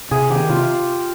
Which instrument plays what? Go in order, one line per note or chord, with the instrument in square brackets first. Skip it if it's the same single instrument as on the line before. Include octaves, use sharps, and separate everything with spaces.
[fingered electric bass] C3 [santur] G#4
[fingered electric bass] D#3 [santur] G4
[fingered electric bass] C3 [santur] F4